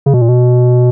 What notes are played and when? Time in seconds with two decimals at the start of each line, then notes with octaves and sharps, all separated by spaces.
0.06 C#3
0.14 B2
0.21 A#2
0.29 B2